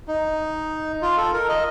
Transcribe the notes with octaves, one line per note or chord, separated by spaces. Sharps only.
D#4
F4
A4
A#4
D#5